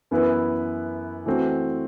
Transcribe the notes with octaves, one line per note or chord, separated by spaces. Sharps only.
F#2 E3 B3 E4 B4
E3 A3 C4 F#4